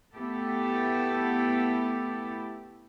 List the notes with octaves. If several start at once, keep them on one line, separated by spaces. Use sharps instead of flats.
A3 B3 E4 G4 A4